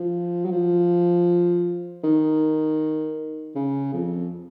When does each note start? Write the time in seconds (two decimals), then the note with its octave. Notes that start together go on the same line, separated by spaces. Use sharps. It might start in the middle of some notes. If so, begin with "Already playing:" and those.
Already playing: F3
0.45 F#3
0.51 F3
2.04 D#3
3.55 C#3
3.93 F2